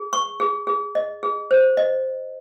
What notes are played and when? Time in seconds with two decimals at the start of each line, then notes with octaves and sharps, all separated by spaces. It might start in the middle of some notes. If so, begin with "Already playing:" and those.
Already playing: G#4
0.13 C#6
0.40 G#4
0.67 G#4
0.95 D#5
1.23 G#4
1.51 C5
1.77 D#5